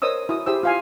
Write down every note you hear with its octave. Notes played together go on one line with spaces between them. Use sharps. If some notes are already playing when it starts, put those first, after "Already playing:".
A#4 C5 C#5 D#5 D#6 E6
E4 F#4 D#6
E4 G4 G#4 C5 E6
F4 F5 G#5